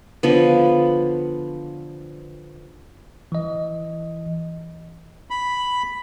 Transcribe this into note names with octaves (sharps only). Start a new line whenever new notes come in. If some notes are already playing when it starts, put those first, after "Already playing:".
D3 F3 B3
E3 D#5
B5